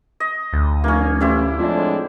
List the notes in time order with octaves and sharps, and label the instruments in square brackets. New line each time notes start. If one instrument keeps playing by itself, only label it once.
[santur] D#5
[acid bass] D2
[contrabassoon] F1 [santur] A#3 C#4
[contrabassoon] A1 [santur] G3 E4 C5
[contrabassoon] F2 [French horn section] A2 G#3 D4